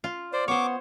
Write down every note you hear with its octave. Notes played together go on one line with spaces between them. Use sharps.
F4
C5 D5
B3 C5 C#5 C#6 D6